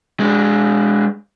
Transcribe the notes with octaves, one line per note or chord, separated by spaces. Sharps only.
G#3 D4